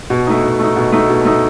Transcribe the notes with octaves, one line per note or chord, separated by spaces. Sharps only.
B2
A3 D#4
B2
A3 D#4
B2
A3 D#4
B2
A3 D#4